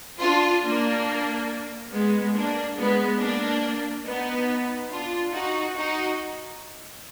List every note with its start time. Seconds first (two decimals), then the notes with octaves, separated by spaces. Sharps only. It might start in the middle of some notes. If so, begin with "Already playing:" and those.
0.20 D4 F4
0.63 A#3 D4
1.91 G#3 B3
2.34 A#3 D4
2.77 G#3 B3
3.19 A#3 D4
4.05 B3 D#4
4.90 D4 F4
5.33 D#4 F#4
5.76 D#4 F#4